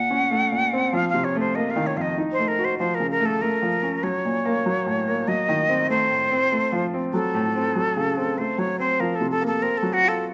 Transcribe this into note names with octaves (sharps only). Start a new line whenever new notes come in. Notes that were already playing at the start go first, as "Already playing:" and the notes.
Already playing: A#2 F#5
C#4
A3
A#2
C4
F3 F5
C3 F5
C#5
A3 C5
A#3 D#5
F5
D#3
C#5
F2 D#5 F5
D#4
C5
A3
A#4
F#4
C5
F3 C5
A#4
C#3
A#4
A3
A4
A3 A#4
F3
C#4
F#3 C#5
A#2
A#3
F#3
A2
A#3
F#3 D#5
D#3
C4
A3 C5
A2
C4
A3
F3
C4
F#3 A4
A2
C4
F#3
C#3
C4
A3 C5
F#3 C#5
C4 C5
F3 A#4
A4
C3
A4
A#3
A4
C4 A#4
F#3 A4
F#4
F4
A4